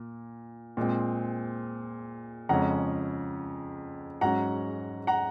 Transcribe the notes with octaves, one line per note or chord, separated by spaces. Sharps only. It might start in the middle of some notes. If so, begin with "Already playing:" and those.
Already playing: A#2
A#2 G#3 C4
F2 C#3 G#3 C#4 F#5 A#5
G#2 F#3 C#4 F#5 A#5
F#5 A#5